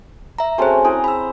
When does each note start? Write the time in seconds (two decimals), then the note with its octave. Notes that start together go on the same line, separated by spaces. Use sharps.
0.39 E5 A#5
0.58 A3 C4 C#4 F#4 G#4 C5
0.85 E4 G#4 C5 A#5
1.04 B5 E6